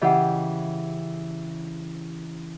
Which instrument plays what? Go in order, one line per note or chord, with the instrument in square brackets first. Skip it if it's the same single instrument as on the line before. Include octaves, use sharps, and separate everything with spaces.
[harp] C#3 E3 G4 [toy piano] D#5 F#5